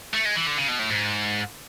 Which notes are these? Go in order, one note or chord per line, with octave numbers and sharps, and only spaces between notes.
A3
G#3
E3
D3
C#3
B2
A2
G#2